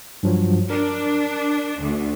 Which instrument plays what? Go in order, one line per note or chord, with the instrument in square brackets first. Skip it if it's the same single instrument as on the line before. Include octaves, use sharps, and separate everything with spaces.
[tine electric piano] G2 F3 F#3
[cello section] D4 [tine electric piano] A#4
[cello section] D2